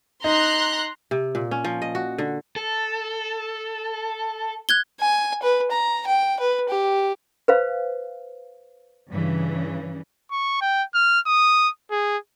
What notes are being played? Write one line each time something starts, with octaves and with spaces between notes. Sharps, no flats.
D#4 A#5 C6 F#6
C3
A#2
C#4
F3
D#5
F#4
D3
A4
F#6 G#6 G7
G#5
B4
A#5
G5
B4
G4
B4 C5 F5
G2 C#3 E3
C#6
G5
F6
D#6
G#4